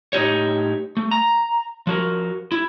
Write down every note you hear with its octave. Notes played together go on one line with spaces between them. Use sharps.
A2 D#4 G4 C#5
A3
A#5
F3 F#4 A#4
E4